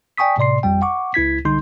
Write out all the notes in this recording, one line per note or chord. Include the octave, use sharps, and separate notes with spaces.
D5 G5 G#5 C#6 D#6 B6
A2 C3 D5 C6 C7
G1 F2 G3 G5
F#5 C#6 D6
C#2 E4 G#6 B6
B1 D3 G3 D#4 C6 G6